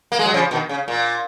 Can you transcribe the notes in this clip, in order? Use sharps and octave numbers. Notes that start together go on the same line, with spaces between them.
A#3
G#3
F#3
C#3 F3
B2 D#3
C#3
A#2